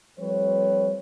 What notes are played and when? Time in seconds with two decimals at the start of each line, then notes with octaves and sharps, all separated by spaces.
0.19 F3 G3 A3 C4 B4 C#5